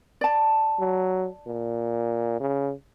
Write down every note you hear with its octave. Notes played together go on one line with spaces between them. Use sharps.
D5 A5
F#3
A#2
C#3